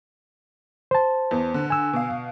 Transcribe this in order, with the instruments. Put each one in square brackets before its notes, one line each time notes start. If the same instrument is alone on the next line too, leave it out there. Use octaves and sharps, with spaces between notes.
[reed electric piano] C5 A5
[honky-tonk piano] E2
D3
[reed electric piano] G#5 E6
[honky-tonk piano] B2 F5